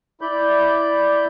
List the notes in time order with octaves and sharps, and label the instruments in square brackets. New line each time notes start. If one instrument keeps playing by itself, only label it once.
[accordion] E4 D5 B5 G6